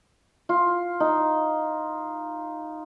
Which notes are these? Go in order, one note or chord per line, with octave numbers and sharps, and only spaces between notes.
F4
D#4